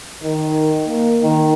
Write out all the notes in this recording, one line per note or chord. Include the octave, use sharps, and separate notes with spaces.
D#3
A#3
D#3